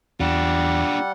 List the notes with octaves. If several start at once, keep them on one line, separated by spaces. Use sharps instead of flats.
E2 G3 D4 F4 F#5